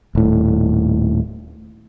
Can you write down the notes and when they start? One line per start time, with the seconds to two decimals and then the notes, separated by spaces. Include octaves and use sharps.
0.15 D#1 A2